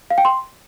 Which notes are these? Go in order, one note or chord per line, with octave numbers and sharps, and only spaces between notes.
F5
G5
C6